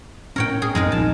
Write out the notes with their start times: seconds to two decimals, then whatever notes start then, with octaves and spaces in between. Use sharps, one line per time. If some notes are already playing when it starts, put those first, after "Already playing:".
0.36 A2 C#4 A#4 C#5 G5
0.62 G#4
0.75 A1 F#2 G#3 C4 D#4 A#4
0.92 A#1 D#2 F3 A5